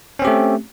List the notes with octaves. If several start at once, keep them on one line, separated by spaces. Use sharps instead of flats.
A3 C4 C#4 G4